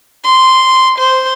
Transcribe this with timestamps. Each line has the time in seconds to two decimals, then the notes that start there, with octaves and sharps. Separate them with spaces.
0.24 C6
0.98 C5